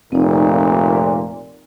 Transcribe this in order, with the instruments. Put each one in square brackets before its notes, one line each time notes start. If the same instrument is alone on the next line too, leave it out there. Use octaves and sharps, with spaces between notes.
[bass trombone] F1 [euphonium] A#2 [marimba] C4 D#4